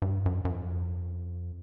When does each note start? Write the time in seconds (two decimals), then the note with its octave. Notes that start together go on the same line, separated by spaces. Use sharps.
0.02 G2
0.26 F#2
0.45 F#2
0.50 F2